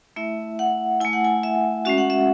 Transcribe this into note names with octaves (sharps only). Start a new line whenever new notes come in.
A3 E4 E5
F#5
A3 E4 G#5
F#5
G#5
E5
G#3 C#4 F#4 E5
F#5
E5